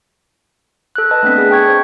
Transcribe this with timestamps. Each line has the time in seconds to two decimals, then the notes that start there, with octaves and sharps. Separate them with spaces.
0.95 A4 F#6
1.11 B4 D#5 A5
1.23 A3 B3 C4 D4 F#6 B6
1.38 G#4
1.51 G5 C#6 G#6
1.68 C5